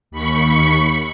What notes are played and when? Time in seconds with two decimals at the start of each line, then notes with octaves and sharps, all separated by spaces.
0.11 D#2 B5 C#6 C#7